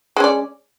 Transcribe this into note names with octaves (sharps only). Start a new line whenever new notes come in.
G#3 C#4 D5